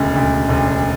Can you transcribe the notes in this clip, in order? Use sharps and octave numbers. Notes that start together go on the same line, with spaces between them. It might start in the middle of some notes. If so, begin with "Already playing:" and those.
Already playing: E1 D2 C#3
E1 D2 C#3
E1 D2 C#3